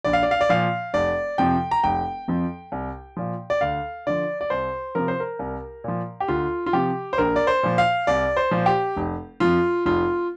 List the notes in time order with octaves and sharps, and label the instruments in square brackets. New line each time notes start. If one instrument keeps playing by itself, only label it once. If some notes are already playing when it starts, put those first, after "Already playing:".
[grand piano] A#1 D5
F5
D5
F5
D5
A#2 F3 F5
F1 D5
F2 C3 F3 G5
A#5
F1 G5
F2 F3
C2
A#2 F3
D5
D2 F5
D3 F3 D5
D5
C2 C5
C3 F3 A#4
C5
A#4
C2
A#2 F3
G4
D2 F4
F4
C3 F3 G4
C5
A#1 A#4
D5
C5
A#2 F3
F5
C2 D5
C5
A#2 F3
G4
F1
F2 F3 F4
F1 F4